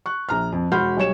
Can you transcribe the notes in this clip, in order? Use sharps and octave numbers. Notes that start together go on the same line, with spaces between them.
C#6 F#6
A#1 A#5 F6
F2
E1 F#4 B5 C6 F6 G6
B1 G3 C#5 E7